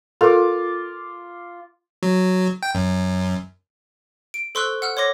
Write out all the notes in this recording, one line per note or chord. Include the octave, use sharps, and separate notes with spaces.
F4 A4 A#4 D6
F#3
G5
F#2
D7
A4 C5 C6 C#6 E6 F#6
F#5 E6 F6
C#5 C6 D6 A#6